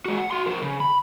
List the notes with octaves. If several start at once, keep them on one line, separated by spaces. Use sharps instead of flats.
G#3 F#4
F#5
F#4 C6
F3 A#4
C#3
B5